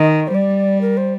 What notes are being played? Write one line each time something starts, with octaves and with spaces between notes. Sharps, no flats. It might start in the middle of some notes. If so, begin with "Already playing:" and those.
Already playing: D#3 D#5
C5
G3 D5
A#4
C5